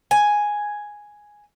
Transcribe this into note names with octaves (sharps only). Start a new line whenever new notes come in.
G#5